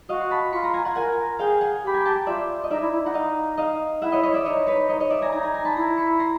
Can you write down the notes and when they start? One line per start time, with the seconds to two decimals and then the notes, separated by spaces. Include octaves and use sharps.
0.09 F#4 D#5 F5
0.21 C6
0.30 A5 B5
0.52 F4 B5 C#6
0.63 A#5 C6
0.74 G#5 A#5
0.85 F#5 G#5
0.95 A#4 F#5 G#5
1.39 G#4 F5 G5
1.61 F#5 G#5
1.84 G4 B5
1.94 G#5 A#5
2.05 G5 A5
2.26 F4 D5 E5
2.64 D#5
2.70 D#4 D5 E5
2.81 E4
2.93 E4
3.04 D#4 F#5
3.14 D#5 F5
3.57 D#5 F5
4.02 E4 E5 F#5
4.12 C#5 D#5
4.23 C#5 D#5
4.34 D5 E5
4.45 D#4 C#5 D#5
4.67 B4 C#5
4.89 C#5 D#5
5.00 C#5 D#5
5.10 D5 E5
5.22 G#5 A#5
5.32 D#4 G#5 A#5
5.43 G#5 A#5
5.54 G#5 A#5
5.65 A5 B5
5.76 E4 A#5 C6
5.98 B5 C#6
6.19 A#5 C6